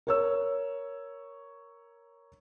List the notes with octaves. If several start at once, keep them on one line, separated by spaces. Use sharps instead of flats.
A#4 C#5 E6